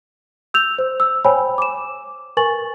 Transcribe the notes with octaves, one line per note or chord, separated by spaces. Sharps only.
E6 G6 F7
C5
E6
C5 C#5 G5 G#5 B5
D6 E7
A#4 B4 G#5 C#6 A6 F#7